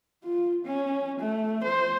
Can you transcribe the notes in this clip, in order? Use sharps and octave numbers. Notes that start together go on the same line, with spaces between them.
F4
C#4
A3
C5